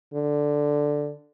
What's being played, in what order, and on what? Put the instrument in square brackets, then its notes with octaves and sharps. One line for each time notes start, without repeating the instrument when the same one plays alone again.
[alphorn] D3